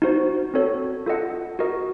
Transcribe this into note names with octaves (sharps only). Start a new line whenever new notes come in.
D#4 F#4 C5
C4 F#4 A4 C#5
F4 A4 D#5 F#5
F#4 A#4 D#5